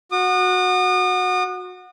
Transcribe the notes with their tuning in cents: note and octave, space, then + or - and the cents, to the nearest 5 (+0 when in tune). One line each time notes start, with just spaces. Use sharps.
F#4 -15 D#6 -40